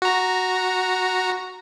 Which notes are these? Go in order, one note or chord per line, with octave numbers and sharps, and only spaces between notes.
F#4 A#5